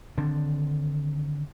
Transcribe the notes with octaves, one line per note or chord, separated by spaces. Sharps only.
D3 D#3 C4 D4